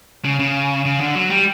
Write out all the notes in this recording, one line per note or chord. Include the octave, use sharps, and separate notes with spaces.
C#3
C#3
C#3
D3
F#3
G3